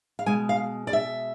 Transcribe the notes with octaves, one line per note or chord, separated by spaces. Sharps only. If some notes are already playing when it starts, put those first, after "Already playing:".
F5
B2 G#3 G#5
F5
D5
E5